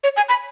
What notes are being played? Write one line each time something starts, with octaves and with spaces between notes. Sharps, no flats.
C#5
G#5
B5